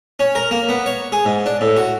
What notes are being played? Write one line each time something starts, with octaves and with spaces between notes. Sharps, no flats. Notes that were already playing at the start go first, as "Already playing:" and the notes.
C#4
A#4
A#3
B3
C#5
G#4
G#2
D4
A2
F#4